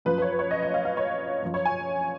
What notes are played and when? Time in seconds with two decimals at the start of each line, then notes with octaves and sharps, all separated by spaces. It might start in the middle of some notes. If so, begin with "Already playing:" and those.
0.05 F#2 F3 B4
0.18 B4
0.22 C#5
0.32 B4
0.39 C#5
0.51 D#5
0.63 D#5
0.74 F5
0.85 F5
0.97 C#5
1.42 F#2 F3
1.54 C#5
1.65 G#5